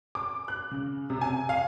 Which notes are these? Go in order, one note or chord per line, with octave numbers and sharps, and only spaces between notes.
D6
F#6
C#3
C3
G#5
F5